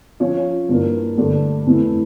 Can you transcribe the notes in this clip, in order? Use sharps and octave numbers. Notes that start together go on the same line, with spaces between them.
F3 C#4 F4 C#5
G2 E3 A#3
G2 D3 A3 D4 A4
F2 E3 A3 E4